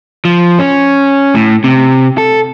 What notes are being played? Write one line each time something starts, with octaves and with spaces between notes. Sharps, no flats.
F3
C#4
A2
C3
A4